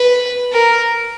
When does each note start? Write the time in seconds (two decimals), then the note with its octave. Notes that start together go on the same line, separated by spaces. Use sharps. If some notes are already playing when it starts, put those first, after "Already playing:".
Already playing: B4
0.52 A#4